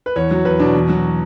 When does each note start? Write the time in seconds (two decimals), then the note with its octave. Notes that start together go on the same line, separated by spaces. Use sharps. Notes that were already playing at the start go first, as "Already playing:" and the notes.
0.06 B4
0.16 E2 C#5
0.31 F#3
0.45 E2 B4
0.60 B2 D4
0.75 E2
0.89 F#3